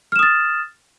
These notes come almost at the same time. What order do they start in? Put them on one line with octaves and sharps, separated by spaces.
F6 E7 D#6 A6